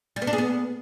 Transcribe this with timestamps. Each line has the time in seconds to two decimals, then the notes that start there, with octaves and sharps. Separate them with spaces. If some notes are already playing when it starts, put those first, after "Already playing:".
0.16 G3
0.22 B3
0.27 D4
0.33 G#4
0.38 B3